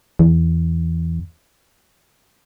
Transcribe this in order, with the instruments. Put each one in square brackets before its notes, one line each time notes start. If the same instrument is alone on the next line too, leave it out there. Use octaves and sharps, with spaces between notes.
[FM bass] E2